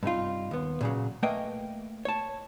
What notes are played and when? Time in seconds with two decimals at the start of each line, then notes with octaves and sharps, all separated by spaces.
0.03 G2 C3 D#4 F4
0.51 D#2 B3
0.81 A#2 C#3 F#3
1.23 A3 A#3 B4 D#5 G5 G#5
2.05 C#5 A5